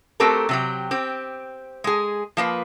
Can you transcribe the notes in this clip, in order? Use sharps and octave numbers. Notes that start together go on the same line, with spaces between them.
A3 C4 F#4 G4 A4 A#4
C3 F#3 G4
C4 G4
G#3 G#4
F3 A#3 B4